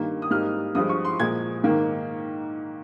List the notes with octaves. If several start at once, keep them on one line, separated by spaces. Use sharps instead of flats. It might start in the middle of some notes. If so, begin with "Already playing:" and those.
Already playing: G2 D#3 A#3
D#6
G#2 G3 A#3 F6
G2 F3 G#3 D#6
C#6
C6
A#2 F3 G#3 G#6
G#2 D#3 A#3